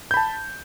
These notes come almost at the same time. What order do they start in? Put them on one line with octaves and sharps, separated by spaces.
G6 B5 A5